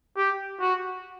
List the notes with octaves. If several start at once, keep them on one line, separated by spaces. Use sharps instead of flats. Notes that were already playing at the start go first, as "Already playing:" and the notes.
G4
F#4